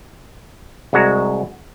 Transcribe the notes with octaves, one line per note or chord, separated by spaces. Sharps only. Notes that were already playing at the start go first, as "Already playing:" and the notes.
C2 G#3 F#4 A#5